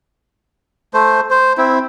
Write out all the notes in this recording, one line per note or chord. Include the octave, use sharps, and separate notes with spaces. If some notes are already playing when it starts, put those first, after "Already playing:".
A3 C5
C5
C4 E4